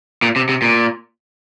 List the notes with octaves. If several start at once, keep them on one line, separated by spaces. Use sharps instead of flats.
A#2
C3
C3
A#2